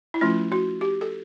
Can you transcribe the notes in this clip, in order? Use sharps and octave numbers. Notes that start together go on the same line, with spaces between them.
E4
F3 A3 C#4 F4
F#4
G4
A4